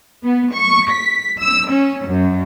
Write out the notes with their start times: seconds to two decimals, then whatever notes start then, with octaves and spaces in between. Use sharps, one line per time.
0.24 B3
0.55 C#6
0.91 B6
1.42 E6
1.72 C#4
2.07 F#2